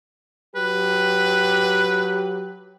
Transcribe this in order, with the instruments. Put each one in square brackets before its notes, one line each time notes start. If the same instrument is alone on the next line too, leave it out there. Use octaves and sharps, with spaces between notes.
[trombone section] F#3 G4 [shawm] B4